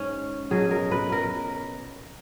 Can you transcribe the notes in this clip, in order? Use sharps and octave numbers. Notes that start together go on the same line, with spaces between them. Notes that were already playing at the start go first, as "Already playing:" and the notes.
Already playing: G#2 C#4
B2 F#3 G#4
A#4
B4
A#4